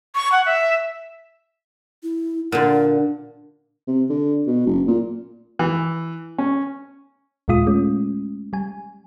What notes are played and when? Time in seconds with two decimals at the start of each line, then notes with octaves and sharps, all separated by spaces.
0.15 C#6
0.32 F#5
0.46 E5
2.03 E4
2.52 A#2 D3 F#5
3.88 C3
4.10 D3
4.47 B2
4.67 F#1
4.88 A#2
5.59 E3
6.38 C#4
7.48 D#2 A#2 G#3 F4 D#6
7.67 G#3 A3 C#4
8.53 G3 G#5